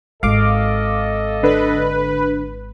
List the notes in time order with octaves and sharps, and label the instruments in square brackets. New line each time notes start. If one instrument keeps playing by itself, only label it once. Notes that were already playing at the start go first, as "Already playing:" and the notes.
[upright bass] G#1 [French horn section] A4 D#5 [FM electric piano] F5 D6
[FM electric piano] D3 [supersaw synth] B4